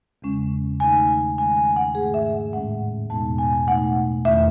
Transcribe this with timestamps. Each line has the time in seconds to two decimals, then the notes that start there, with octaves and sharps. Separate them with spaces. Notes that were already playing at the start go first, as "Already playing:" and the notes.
0.22 E2 C#3 G#3 C#4
0.80 D#3 A3 D#4 G#5
1.38 D#3 G#3 C#4 G#5
1.57 G#5
1.76 F#5
1.95 G#2 D#3 A3 G#4
2.14 E5
2.33 F#5
2.53 A2 G#3 C#4 F#5
3.10 E2 B2 G#3 B3 D#4 A5
3.38 G#5
3.67 B2 A3 D#4 F#5
4.25 E2 D#3 A3 C#4 E5